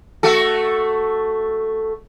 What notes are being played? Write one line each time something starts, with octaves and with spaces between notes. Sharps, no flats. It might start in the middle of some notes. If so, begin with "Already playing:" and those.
A3 F#4 A4